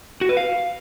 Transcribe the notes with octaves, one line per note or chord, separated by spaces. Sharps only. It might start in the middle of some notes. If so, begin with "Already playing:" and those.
F#4
B4
F5